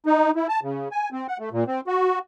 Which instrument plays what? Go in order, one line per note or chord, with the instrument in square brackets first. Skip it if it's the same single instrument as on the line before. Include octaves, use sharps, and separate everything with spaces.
[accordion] D#4
E4
A5
C#3
G#5
C4
F#5
A3
A#2
C4
F#4